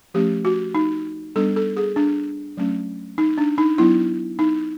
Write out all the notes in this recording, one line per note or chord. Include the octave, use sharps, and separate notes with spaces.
F3 A3 C#4 G4
F#4
D#4
G3 B3 D4 A4
A4
G#4
D4
F#3 A3 C#4
D#4
D4
D#4
F#3 B3 D4 E4
D#4